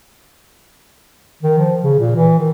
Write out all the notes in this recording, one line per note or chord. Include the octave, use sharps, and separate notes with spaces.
D#3
F3
C#3
A#2
E3
D#3